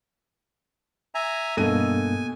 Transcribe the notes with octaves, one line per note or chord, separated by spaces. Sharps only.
E5 G#5 A#5
G2 B2 A#3 A4 D#5 G#5 D#7